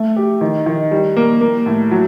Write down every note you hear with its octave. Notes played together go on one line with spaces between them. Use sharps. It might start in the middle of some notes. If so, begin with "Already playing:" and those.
Already playing: A3
G4
D#3
D#3
G3
A#3
A#3
A2
F#3